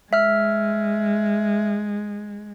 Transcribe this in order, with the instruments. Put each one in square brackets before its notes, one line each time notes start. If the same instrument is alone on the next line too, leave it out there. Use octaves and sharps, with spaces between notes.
[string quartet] G#3 [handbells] E5 F6